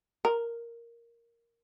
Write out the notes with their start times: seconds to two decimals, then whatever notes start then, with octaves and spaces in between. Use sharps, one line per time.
0.25 A#4